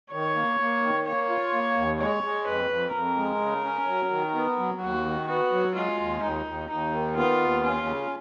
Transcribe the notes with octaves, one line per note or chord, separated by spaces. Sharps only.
D#3 C#5
A#3
A#3
D#3
A#3 C#5
F4
A#3
D#2
G#3 C#5
G#3
F2 B4
F2
F2 A#4
G#3
C#3
C#4
F#3
D#3
B3
F#3
D#2 F#4
D#3
B3 F#4
F#3
G#3 F4
D#2
D#2 D#4
D#2
D#2 D#4
D#3
B3 F4
D#2
C#4 F4
C#3